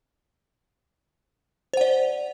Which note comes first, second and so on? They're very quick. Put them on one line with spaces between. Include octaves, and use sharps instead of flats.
C5 F#5 D5